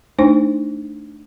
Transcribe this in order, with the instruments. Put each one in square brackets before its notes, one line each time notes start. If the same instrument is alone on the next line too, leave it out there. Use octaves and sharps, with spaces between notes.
[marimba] A3 D4 D#4 C5